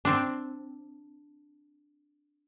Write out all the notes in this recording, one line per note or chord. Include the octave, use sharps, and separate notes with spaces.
C4 D4